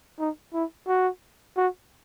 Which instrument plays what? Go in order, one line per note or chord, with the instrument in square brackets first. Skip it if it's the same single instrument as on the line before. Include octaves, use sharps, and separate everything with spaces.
[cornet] D#4
E4
F#4
F#4